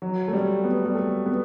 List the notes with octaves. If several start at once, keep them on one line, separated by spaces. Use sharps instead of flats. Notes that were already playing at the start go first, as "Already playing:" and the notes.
F#3
A3
G3
B3
G3
A3
B3